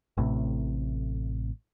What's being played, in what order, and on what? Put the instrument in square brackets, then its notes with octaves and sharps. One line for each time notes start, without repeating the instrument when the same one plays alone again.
[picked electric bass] A1 A2 C3